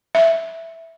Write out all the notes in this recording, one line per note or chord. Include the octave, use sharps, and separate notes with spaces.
E5